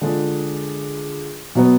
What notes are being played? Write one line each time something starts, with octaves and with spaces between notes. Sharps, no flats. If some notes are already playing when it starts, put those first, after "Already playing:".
D3 G#3 D4 F4 G#4
B2 F#3 B3